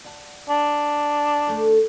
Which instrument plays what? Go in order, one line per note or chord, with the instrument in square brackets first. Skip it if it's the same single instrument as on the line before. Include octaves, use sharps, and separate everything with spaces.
[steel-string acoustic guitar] D5 F#5 A5
[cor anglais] D4
[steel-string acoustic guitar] D3 A3 A4